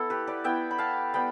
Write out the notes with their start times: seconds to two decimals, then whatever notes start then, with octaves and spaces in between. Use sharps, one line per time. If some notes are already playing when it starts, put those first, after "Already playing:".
Already playing: B3 E4 A4
0.10 G4 B4
0.27 B4 D5
0.44 B3 E4 E5 G5
0.71 B5
0.79 F5 A5
1.14 G3 B3 G5 B5